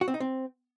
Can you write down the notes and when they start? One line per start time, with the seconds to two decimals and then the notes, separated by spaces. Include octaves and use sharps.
0.01 F#4
0.08 C4
0.14 D#4
0.20 C4